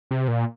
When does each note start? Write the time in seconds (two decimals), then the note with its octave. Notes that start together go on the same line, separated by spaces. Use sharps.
0.11 C3
0.28 A#2